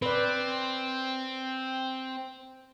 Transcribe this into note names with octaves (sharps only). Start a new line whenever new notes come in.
C4 B4 D5